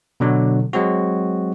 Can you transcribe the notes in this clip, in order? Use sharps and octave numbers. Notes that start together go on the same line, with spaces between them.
B2 D3 F#3
F#3 G#3 C4 F#4